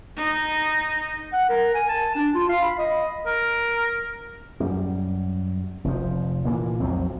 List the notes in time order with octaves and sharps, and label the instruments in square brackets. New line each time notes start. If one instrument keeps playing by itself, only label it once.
[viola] D#4
[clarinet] F#5
A#4
G#5
A5
D4
F4
F5
B5
D#5
[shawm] A#4
[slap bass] F#2 G3
F1 F3
A#2 E3 A#3
B1 F2 F#3 C4